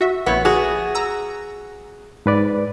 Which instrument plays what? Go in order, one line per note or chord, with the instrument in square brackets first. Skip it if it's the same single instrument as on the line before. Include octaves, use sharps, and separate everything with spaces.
[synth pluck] F#4 E5
[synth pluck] A#1 E4 C#5 [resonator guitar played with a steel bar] B3
[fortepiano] F#4 [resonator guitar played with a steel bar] G#4
[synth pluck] A#5 E6
[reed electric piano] G#2 B4 D5